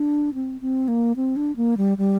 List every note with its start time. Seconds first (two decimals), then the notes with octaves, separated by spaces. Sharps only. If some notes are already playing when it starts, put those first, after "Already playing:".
Already playing: D4
0.34 C4
0.61 C4
0.88 A#3
1.16 C4
1.36 D4
1.56 A#3
1.77 G3
1.98 G3